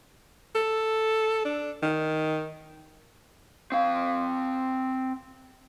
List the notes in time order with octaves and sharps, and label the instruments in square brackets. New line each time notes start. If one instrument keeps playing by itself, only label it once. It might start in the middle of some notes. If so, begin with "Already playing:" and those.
[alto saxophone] A4
D4
D#3
[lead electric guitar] C4 F5